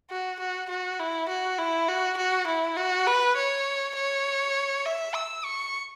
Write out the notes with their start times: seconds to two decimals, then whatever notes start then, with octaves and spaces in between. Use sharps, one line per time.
0.10 F#4
0.40 F#4
0.69 F#4
1.00 E4
1.29 F#4
1.58 E4
1.88 F#4
2.17 F#4
2.47 E4
2.77 F#4
3.07 B4
3.36 C#5
3.96 C#5
4.86 E5
5.15 E6
5.45 C#6